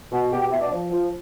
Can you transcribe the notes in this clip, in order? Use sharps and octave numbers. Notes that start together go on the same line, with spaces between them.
B2
B2 G4
G4
B2 E4
D4
F3
F3